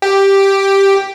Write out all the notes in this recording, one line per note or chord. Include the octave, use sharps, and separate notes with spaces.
G4